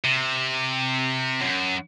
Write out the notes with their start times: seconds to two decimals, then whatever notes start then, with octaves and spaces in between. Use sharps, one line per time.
0.04 C3
1.41 F#2